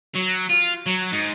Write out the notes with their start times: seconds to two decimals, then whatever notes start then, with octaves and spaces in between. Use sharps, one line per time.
0.15 F#3
0.49 F4
0.86 F#3
1.12 G#2